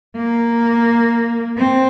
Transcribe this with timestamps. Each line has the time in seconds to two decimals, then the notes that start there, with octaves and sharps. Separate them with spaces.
0.16 A#3
1.58 C4